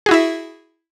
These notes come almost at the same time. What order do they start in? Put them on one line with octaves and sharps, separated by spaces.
G#4 F#4 E4 E5